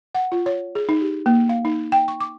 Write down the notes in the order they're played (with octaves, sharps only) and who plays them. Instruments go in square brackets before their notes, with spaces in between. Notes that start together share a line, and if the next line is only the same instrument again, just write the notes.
[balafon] F#5
F4
C#5
G#4
D#4
G4
A#3
F5
D#4
G5
C#6
D6